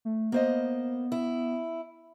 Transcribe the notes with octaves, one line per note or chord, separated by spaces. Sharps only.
A3
A#3 B3 C5 D#5
E4